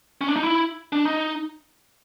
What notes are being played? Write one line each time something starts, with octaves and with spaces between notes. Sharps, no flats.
C#4
D4
D#4
E4
D4
D#4